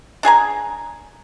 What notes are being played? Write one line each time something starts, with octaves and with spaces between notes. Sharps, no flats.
D4 G#4 G#5 A#5